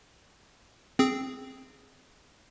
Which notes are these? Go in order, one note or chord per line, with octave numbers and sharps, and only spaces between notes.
C4 G#4